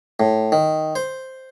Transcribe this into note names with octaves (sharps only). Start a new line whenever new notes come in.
A2
D#3
C5